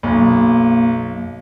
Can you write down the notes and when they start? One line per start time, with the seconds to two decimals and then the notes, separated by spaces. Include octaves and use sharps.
0.03 B1 F#2 A#3